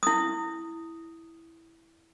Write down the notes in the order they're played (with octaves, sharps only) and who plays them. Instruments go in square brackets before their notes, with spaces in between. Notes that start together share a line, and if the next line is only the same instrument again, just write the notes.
[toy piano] E4 D#6